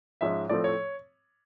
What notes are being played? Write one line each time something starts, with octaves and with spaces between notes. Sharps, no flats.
G#2 F3 G#3 C#4 E5
A2 F3 A3 C4 D5
C#5